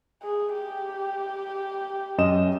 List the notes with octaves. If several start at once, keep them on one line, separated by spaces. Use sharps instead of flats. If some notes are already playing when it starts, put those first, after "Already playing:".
G#4
G4
F#2 D#5 E7